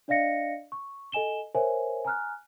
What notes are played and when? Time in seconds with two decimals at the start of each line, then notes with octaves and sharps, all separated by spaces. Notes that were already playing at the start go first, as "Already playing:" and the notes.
0.08 D4 D5 D#5 F5 A#6 C#7
0.72 C#6
1.12 A4 D#5 G#5 E7 G7
1.55 A#4 C5 C#5 E5 G#5
2.04 G#5 A#5 F6 F#6